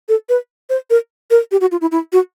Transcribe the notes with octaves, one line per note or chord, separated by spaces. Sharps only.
A4
B4
C5
A#4
A#4
G4
F#4
F4
E4
E4
F#4